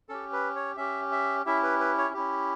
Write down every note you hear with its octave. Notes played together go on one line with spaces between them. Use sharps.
C#4 G4 A4
B4
C#5
C#4 G4 E5
E5
C#4 E4 G4 E5
B4
B4
C#5
C#4 E4 G4